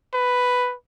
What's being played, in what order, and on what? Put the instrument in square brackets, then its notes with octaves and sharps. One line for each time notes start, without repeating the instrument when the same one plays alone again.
[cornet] B4